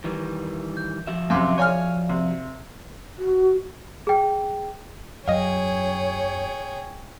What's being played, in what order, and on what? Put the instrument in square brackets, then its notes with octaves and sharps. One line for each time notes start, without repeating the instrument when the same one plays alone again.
[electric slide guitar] D#3 E3 G3
[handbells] G6
[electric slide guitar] F3 F#4 E5
[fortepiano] F#2 C3 [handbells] F5 C6 D6
[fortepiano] C#5 G#5 F6 [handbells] D5 F5
[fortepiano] C3
[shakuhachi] F#4
[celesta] G#4 G5
[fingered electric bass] F#2 F#3 [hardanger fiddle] G#4 G5 [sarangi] C#5 [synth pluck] D#5 F5